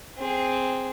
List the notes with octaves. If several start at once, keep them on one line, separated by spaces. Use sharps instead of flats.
C4 G#4